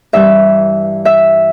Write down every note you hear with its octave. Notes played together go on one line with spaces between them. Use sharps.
G2 E3 G3 E5
E5